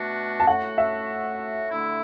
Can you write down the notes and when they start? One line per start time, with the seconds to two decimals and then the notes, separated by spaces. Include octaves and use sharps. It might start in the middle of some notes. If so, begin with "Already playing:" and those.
Already playing: B2 A3 D4 F#4
0.40 A5
0.47 A2 A3 F#4 F#5
0.78 E5
1.70 D3 A3 E4